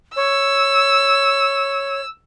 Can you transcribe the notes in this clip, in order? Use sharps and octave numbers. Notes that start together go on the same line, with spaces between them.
C#5 E6